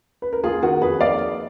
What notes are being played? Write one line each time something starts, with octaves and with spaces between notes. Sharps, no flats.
B4
A#4
A#3 F4 G#4
D#3 F#4 A#4
F2 G#4 B4
A#3 D5 F5